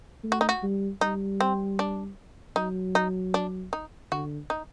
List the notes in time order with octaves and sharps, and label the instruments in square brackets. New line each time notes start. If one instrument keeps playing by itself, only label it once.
[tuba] A3
[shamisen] F#4
D#4
F#4
[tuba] G3
[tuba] G3 [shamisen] D#4
[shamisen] C4
D4
[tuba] F#3 [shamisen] D#4
[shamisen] D#4
D4
D#4
[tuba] D3 [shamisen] F#4
[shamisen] D#4